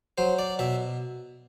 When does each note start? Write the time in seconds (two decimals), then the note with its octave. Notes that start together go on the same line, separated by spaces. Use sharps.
0.18 F#3 C5
0.39 D5
0.59 B2 E5